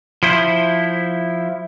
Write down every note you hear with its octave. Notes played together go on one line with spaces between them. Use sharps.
F3 E4 C5